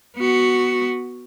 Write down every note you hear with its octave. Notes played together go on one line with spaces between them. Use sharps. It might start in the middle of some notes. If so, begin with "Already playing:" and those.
B3 F#4